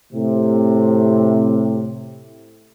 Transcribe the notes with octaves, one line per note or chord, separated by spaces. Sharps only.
A2 C3